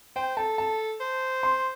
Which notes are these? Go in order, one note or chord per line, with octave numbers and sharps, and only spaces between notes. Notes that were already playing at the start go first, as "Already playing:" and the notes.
C5 G5
A4 A5
A5
C5
C6